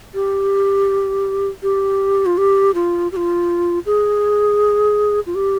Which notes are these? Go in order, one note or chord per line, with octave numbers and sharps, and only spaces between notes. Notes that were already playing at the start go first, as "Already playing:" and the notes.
G4
G4
F4
G4
F4
G4
F4
G#4
F4
G4